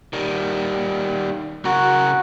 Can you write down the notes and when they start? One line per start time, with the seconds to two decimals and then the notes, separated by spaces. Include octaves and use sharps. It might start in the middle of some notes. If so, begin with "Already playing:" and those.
0.13 D#3 G3
1.65 C#3 F#4 A#4